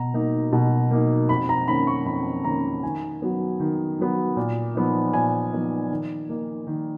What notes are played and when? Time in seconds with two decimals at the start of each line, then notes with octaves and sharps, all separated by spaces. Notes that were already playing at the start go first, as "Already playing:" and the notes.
Already playing: B2 A#5
0.14 A#3 D#4
0.52 B2
0.91 A#3 D#4
1.29 F2 B5
1.49 A#5
1.68 D#3 A#3 C#4 B5
1.87 C#6
2.06 F2 B5
2.44 D#3 A#3 C#4 A#5
2.83 D#3 G#5
3.22 F#3 B3
3.60 D#3
3.99 F#3 B3
4.37 A#2
4.75 F3 B3 D#4
5.13 A#2 G#5
5.52 F3 B3 D#4
5.90 D#3
6.29 A#3 D#4
6.67 D#3